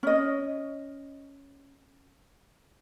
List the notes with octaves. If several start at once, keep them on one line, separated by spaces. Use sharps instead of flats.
C#4 D#5